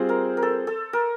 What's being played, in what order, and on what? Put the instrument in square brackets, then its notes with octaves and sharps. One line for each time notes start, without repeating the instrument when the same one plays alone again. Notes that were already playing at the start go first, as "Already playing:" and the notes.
Already playing: [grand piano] G3 C4 F4 G#4 [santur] C5
[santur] A#4
A#4
A4
A4
A#4